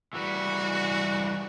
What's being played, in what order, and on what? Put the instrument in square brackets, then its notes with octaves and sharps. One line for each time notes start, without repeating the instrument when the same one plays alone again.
[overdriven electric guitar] E3 G3 [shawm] F#4